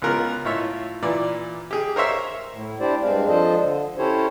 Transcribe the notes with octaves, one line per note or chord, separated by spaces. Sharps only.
C#2 B3 C#4 F4 A#4 F#6
A2 F4 C#5 E5
A#2 E3 D5
G4 G#4
A#4 C5 C#5 E5
A2
D4 E4 G4 C5 D5
G2 G#3 C4 D4 F5
F3 D4 F4 A4 C5 D#5
D3
C#4 E4 G4 A4 C5 C#5